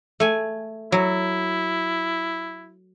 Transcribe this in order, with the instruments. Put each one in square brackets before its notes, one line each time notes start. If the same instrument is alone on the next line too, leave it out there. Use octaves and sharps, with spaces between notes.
[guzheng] A3 G#5
[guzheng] F#3 [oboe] E4